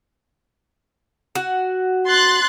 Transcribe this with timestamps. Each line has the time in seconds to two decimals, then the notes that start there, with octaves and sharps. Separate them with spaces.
1.35 F#4 F#5
2.07 C6 F#6 A6